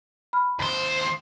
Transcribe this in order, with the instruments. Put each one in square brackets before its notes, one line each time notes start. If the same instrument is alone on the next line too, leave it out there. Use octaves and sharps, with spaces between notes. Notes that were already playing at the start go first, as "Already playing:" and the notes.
[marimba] B5 F6
[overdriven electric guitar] D#2 C5